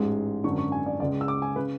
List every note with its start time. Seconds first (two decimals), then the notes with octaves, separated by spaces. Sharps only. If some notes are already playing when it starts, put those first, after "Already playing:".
Already playing: A1 G#2 G#3
0.44 G#1 F#2 D3 C#6
0.58 C#6
0.72 G#5
0.86 D5
1.00 C#2 C#3 G#3 D5
1.21 E6
1.28 D6
1.42 G#5
1.56 C#3 B4